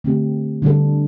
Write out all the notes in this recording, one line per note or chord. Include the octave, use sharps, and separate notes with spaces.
D3 A3 C4 G4
D3 G3 D4 A4